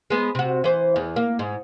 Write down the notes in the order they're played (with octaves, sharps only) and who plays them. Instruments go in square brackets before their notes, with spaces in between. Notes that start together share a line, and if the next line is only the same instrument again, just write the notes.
[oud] G#3 B3
C3 F#4
E3 C5
E2
A#3
G#2